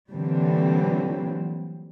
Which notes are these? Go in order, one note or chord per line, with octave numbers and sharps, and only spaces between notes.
A#2 D3 E3 F#3 G3 C4